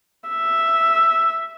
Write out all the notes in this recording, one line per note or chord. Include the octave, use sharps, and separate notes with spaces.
E5